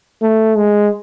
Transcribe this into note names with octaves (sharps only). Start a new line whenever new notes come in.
A3
G#3